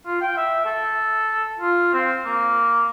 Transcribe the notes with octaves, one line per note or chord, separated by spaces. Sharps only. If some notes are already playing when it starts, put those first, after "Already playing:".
F4
G5
E5
A4
F4
C4
A#3